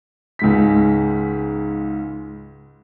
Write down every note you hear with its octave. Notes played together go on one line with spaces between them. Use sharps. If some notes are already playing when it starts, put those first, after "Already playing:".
C#2 G#2 B6